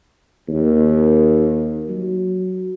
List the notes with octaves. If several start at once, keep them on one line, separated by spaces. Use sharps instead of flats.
D#2
F#3